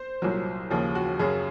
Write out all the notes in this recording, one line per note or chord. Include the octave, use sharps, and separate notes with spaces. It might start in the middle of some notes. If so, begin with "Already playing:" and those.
Already playing: C5
C2 A#2 F#3
D#2 C#3 F3
F#4
F#2 C#3 F#3 G#4